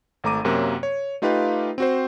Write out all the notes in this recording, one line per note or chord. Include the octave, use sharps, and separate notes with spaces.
G#1 A3 A#5 D6 D#7
F#2 C3 F#3 A#3
C#5
A3 D#4 F4 G4 B4 F5
C4 F#4 C5